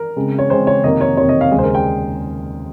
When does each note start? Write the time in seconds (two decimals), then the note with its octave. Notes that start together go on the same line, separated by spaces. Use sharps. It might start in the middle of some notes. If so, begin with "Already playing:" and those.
Already playing: A#4
0.16 C#3 G#3 C4
0.39 C#5
0.50 C#3 G#3 C4 C5
0.67 C#5
0.83 F2 C3 D#3 A#3 D#5
1.01 C#5
1.17 F2 C3 D#3 A#3 C#5
1.29 D#5
1.41 F5
1.51 D#2 C#3 G#3 G#4
1.59 C5
1.63 A#4
1.75 G5